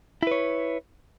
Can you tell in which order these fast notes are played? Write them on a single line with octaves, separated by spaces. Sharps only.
E4 B4 C#5